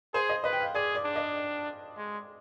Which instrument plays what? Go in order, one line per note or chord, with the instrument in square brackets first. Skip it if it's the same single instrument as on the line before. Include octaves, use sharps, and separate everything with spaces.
[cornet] G#4 [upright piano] C5
[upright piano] D#5
[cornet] B4 [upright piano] D#5
[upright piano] G5
F5
[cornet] G#4 [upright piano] D5
[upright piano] D5
[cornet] D4
[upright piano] D#5
[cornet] G#3